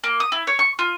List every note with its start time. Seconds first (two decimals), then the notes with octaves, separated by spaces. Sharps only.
0.04 A#3
0.20 D#6
0.32 E4
0.47 C#5
0.59 C#6
0.79 F4